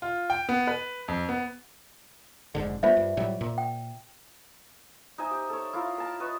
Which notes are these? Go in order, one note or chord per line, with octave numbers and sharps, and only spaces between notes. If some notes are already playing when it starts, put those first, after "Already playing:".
F4
G5
B3
B4
F2
B3
F1 G#2 D3
G3 A3 B3 F4 C5 E5
G2
A2 F#3 G3
A#2
G5
D#4 C5 E5 G#5
G4
A4 C#5
E4 F4 A#4
A#4 A5
B4 D#5 C#6